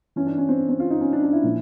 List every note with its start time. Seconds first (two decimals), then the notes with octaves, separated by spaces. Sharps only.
0.16 G2 E3 C#4
0.27 D4
0.38 C#4
0.48 C4
0.69 C4
0.80 F4
0.91 D#4
1.01 C#4
1.13 D4
1.23 D4
1.33 E4
1.43 A#2 F3